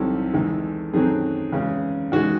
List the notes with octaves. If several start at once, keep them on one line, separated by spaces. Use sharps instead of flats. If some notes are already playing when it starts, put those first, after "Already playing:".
Already playing: C2 C3 D#3 F#3 A4
E2 D#3 G#3 D#4
F#2 D#3 F#3 A3 C4 G#4
E2 C#3 G#3 C#4
E2 D#3 G#3 F#4